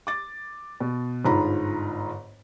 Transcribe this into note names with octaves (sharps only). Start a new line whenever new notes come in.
D6 A6
B2
G1 G#2 F4 A#5 B5